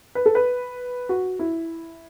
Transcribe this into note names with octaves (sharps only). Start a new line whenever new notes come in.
B4
A4
B4
F#4
E4